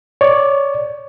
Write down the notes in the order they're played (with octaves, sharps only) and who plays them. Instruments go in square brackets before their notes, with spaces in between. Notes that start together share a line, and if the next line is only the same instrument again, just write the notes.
[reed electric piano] C#5 D5